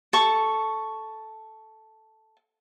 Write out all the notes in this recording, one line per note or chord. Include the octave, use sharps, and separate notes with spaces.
A4 C#6